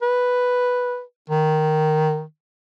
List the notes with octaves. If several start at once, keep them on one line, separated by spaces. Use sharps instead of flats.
B4
D#3